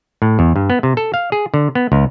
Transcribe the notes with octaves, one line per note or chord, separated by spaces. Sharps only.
A2
E2
G2
B3
C3
A4
F5
G#4
D3
B3
C#2